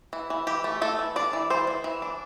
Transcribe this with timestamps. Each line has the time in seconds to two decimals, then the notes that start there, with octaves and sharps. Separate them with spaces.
0.13 E3
0.30 E3
0.47 E3 G4
0.64 A3
0.82 A3 A4
0.99 E3
1.16 D4 D5
1.33 E3
1.50 E3 C5
1.67 E3
1.84 E3
2.02 D4